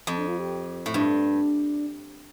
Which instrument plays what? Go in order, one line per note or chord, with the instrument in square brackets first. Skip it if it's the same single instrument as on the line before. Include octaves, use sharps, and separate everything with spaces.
[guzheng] F2 [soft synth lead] C4
[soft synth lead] D4
F4
G4
[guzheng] A2
[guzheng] G2 [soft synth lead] D4